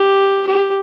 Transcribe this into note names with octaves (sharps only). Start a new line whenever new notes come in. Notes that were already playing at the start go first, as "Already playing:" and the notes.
Already playing: G4
G4